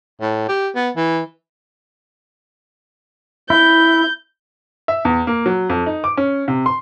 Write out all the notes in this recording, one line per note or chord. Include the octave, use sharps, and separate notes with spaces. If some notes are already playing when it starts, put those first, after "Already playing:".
A2
G4
B3
E3
E4 G6
E5
E2
A#3
F#3
F2
D#4
D6
C#4
C3
C6